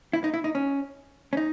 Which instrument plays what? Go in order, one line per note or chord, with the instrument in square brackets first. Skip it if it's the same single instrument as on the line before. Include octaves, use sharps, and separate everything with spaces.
[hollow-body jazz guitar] E4
D#4
E4
D#4
C#4
C#4
D#4